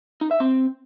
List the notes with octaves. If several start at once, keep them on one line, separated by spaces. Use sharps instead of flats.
D#4
E5
C4